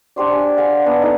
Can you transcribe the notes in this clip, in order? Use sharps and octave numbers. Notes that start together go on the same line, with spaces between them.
D4 G4 C5 D5
G#5
F5 F#5 G#5 A#5
B3 D4 F#5
D#4 A4 D#5 A#5